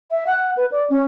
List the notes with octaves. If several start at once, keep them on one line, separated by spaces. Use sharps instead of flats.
E5
F#5
B4
D5
C#4